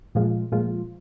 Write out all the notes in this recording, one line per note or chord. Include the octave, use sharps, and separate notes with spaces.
A#2 F3 G#3 F4
A#2 F3 G#3 F4